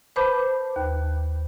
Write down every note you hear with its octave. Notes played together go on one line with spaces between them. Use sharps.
B4 C5 A5 B5 D6 G6
D#2